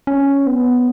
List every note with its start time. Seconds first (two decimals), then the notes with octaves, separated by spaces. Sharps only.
0.07 C#4
0.47 B3